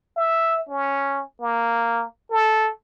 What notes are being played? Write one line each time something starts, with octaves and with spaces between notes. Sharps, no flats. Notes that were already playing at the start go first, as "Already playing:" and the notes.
E5
C#4
A#3
A4